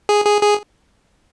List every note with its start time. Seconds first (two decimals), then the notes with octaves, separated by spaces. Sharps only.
0.09 G#4
0.26 G#4
0.42 G#4